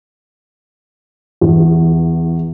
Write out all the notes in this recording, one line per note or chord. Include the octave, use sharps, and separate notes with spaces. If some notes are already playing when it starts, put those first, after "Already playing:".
E2